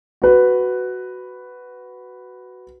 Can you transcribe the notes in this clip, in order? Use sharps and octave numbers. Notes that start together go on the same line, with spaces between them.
F#4 B4